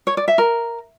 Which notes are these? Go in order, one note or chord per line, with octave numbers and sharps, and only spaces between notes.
C#5
D5
E5
A#4